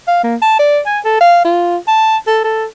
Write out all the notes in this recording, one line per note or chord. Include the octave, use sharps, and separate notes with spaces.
F5
A#3
A5
D5
G#5
A4
F5
F4
A5
A4
A4